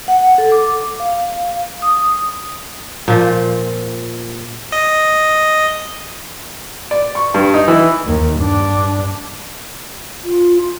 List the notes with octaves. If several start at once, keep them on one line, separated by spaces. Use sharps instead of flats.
F#5
A4
D6
F5
D#6
A#2 F3
D#5
D5
C#6
G2
D#4
E3
D#2
G2 D4
F4